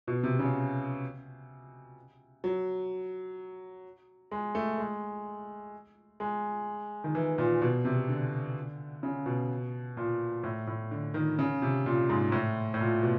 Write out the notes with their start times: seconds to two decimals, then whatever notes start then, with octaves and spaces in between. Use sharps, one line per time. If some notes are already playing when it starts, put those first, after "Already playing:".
0.08 B2
0.23 C3
0.39 C#3
2.44 F#3
4.31 G#3
4.55 A3
4.78 G#3
6.20 G#3
7.04 D#3
7.15 E3
7.38 A#2
7.61 B2
7.85 C3
8.09 D3
9.03 C#3
9.26 B2
9.97 A#2
10.43 A2
10.67 A2
10.91 D3
11.14 D#3
11.39 C#3
11.62 C3
11.86 A#2
12.10 G#2
12.32 A2
12.74 A2
12.80 A#2
13.03 B2